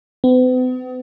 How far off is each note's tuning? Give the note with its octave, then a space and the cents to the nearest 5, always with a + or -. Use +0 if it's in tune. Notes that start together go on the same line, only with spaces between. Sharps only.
B3 +45